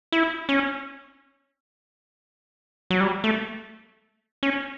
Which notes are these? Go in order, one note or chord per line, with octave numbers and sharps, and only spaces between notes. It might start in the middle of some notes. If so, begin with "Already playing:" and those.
E4
C#4
F#3
G3
A3
C#4